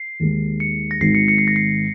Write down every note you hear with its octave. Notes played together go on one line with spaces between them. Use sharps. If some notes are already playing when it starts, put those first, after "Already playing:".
Already playing: C7
D#2 D#3 G#3
C#7
A#6
G#1 G#2 D#3 C7
C#7
C#7
C7
A#6
C7